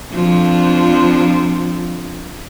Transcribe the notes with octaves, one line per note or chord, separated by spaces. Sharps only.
F2 F3 D4